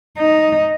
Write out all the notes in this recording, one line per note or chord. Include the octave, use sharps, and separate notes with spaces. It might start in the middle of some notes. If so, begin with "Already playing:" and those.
D#4